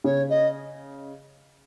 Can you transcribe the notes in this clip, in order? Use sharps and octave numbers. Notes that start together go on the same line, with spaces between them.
C#3 C#5
D#5